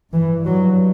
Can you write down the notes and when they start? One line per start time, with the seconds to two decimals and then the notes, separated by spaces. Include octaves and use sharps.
0.13 G2 E3
0.45 F#3